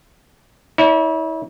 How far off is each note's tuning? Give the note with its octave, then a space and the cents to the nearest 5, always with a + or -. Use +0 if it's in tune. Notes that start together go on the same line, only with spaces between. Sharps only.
E4 -40 C#5 +40